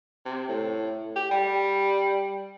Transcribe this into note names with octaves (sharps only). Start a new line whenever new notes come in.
C3
A2
G4
G3